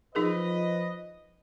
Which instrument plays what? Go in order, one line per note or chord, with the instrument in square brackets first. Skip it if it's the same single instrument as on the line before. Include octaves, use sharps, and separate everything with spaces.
[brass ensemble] F3 B4 D#5 [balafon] D#4 G#4 A#4